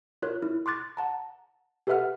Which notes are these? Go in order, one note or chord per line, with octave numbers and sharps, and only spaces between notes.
F4 A#4 C#5 F#6
E4
C6 D6 F#6 A6
F#5 A5 A#5
G4 A4 B4 E5 F#5 F6